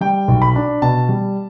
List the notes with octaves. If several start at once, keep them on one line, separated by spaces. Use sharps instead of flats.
G3 G5
B1
B5
D4
B2 A5
G3